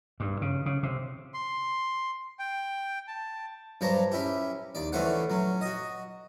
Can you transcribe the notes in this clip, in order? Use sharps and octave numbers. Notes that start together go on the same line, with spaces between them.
G2
C#3
C#3
C3
C6
G5
A5
G2 F#3 C5 A5 A#5
C#4 E4 G4
D#2 D5
D3 E3 A3 C#4 C5 F#5
F#3 C#4
F#4 D#5